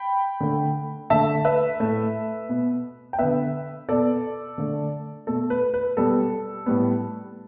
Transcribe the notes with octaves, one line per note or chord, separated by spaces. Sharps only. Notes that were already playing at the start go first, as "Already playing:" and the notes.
Already playing: G5 B5
D3 A3
D3 A3 E5 A5
B4 E5
A2 A3
B2 B3
G5
D3 B3 B4 E5
B2 B3 A4 D5
D3 A3
B2 A3 A4
B4
B4
B2 G3 B3 A4
A2 G3 B3